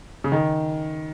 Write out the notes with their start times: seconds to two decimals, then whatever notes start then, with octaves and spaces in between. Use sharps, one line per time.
0.24 C#3
0.32 D#3